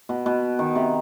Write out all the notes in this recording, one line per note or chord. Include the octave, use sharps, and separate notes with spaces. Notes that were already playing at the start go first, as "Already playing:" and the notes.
B2
B2
D#3
C3